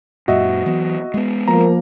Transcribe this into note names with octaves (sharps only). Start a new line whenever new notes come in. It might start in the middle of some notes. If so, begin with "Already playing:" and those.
F#2 A#2 F#4 D#5 E5
E3 F#3 B3
G#3 B3
F3 A#3 A#5